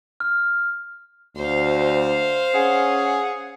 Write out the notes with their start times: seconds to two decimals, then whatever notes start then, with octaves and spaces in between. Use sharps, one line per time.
0.20 F6
1.36 D2 C5 F5
2.55 C#4 G#4 F#5